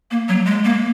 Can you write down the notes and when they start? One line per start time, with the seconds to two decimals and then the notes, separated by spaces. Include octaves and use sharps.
0.11 A#3
0.29 F#3
0.46 G#3
0.65 A#3